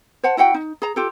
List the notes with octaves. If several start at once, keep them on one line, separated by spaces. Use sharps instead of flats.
C5 F#5 A5
E4 F#4 F#5 G5
D#4
G#4 A#5
F4 G4 A4